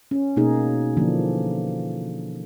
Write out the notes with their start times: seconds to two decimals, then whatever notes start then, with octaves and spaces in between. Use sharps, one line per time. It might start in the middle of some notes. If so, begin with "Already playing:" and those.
0.11 C#4
0.36 B2 A#3 D#4 G#4
0.97 D3 E3 F3 A#3 D4